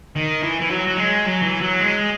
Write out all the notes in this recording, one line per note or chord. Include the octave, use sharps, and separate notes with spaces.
D#3
E3
E3
F#3
F#3
G#3
F#3
E3
F#3
G#3